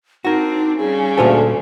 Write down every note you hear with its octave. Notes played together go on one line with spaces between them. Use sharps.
C4 D4 D#4 F#4 A#4
C#3 G3 G#4
D2 A#2 F4 A4